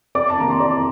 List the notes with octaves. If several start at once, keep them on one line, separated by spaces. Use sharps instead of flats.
F2 D5 D6
A5
C3 D#3 A#3 A#5
C6
F2 D5 D6